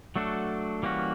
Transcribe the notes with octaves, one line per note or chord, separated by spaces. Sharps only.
F#3 A3 D4 F#4 A4
E3 G3 A#3 C#4 F#4